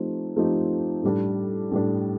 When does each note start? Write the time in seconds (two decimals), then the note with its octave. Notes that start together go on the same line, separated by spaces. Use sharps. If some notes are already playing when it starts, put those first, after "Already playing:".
Already playing: F3 A3 C4 D#4 G4
0.36 F3 A3 C4 D#4 G4
1.03 A2 G3 D4
1.71 A2 G3 D4